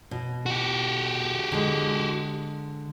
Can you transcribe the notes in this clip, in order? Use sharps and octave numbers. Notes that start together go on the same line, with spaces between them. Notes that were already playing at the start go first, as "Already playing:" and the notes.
B2
F#4 G4
D3 G#3